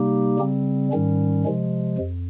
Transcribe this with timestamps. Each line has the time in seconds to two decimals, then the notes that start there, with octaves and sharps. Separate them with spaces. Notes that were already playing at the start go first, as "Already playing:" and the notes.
Already playing: C3 G3 A#3 D#4 G4
0.39 C#3 G3 C4
0.92 G#2 D#3 G3 C#4
1.45 C3 F3 G#3
1.98 F2